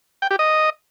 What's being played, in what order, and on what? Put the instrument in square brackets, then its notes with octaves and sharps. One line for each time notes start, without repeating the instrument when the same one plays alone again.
[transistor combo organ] G5
G4
D#5